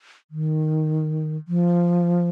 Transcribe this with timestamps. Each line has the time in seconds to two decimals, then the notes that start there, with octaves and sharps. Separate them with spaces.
0.31 D#3
1.48 F3